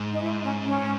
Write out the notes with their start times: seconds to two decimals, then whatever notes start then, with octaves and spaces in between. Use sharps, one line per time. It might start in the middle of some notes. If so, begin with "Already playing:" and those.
Already playing: G#2
0.13 D#4
0.22 E4
0.43 C#4
0.65 C#4